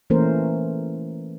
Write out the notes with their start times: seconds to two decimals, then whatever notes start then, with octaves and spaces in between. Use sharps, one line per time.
0.10 E3 A3 A#3 C#4 A#4 C5